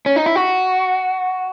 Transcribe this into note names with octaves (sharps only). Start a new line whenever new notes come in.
C#4
D#4
E4
F#4